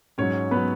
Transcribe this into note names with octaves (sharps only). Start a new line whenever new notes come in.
G#2 F#3 C#4 C#5
F#3 B3 B4